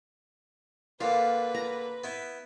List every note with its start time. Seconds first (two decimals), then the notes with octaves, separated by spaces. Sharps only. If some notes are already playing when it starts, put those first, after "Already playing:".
1.01 A#2 D3 B4 F5
1.55 A#5
2.04 B3 E4